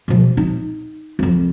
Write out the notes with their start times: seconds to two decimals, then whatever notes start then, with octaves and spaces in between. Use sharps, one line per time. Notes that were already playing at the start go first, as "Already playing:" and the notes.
0.08 B2 F3
0.37 D#4
1.19 C2 F2